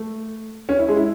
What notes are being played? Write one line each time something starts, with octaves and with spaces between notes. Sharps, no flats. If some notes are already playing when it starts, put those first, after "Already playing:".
Already playing: A3
C#4
E4
G#3
E4